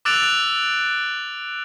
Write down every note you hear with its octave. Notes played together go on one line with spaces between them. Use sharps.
D6 E6 F#6 A6 D7 F7